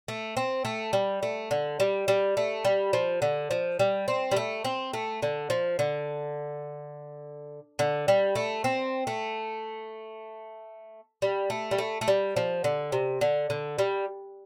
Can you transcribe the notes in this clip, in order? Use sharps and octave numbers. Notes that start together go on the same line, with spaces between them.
A3
C4
A3
G3
A3
D3
G3
G3
A3
G3
F3
D3
F3
G3
C4
G3
A3
C4
A3
D3
F3
D3
D3
G3
A3
C4
A3
G3
A3
G3
A3
A3
G3
F3
D3
C3
D3
D3
G3